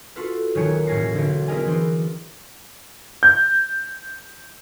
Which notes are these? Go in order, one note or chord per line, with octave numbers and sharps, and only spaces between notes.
F4 F#4 A4 B4
D#1 D#3 F#3 C#5 G#5 C#7
E1 A2 C#4 G#5 A#6 C7
B1 D3
B3 E4 G#4 A#4 D#5 G#5
E3 D4 F#4 C5
G6